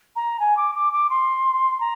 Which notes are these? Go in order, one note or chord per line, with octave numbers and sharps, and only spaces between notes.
A#5
G#5
D6
D6
D6
C6
A#5